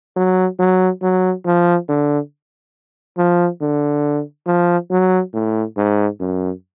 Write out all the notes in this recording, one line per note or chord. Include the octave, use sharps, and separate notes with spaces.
F#3
F#3
F#3
F3
D3
F3
D3
F3
F#3
A2
G#2
F#2